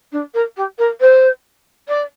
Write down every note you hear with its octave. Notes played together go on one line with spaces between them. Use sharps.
D4
A#4
G4
A#4
C5
D5